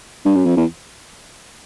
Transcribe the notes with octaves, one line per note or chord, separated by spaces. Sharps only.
G2
F#2
F2
E2